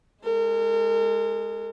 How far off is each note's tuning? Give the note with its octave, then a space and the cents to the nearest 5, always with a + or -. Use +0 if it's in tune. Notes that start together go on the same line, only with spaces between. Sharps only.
G#3 +0 A#4 -40